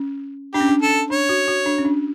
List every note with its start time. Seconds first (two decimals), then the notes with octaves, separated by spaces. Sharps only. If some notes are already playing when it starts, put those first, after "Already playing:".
Already playing: C#4
0.54 D4 G4
0.61 C#4
0.68 D4
0.82 A4
1.10 D4 C#5
1.29 F#4
1.48 F#4
1.66 D4
1.78 C#4
1.85 D4